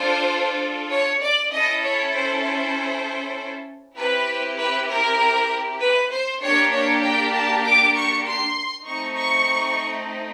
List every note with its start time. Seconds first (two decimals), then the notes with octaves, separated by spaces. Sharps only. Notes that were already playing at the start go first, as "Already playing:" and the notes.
Already playing: D4 F4 A4 C5
0.91 C#5
1.21 D5
1.52 C#4 E4 A4 D#5
1.83 C#5
2.13 C5
2.43 C5
3.97 C4 E4 G4 B4
4.58 B4
4.89 A#4
5.80 B4
6.11 C5
6.41 A#3 D4 G4 C#5
6.72 C#5
7.02 G5
7.33 A5
7.64 D6
7.94 C#6
8.25 C6
8.86 A3 C4 D#4 C#6
9.17 C#6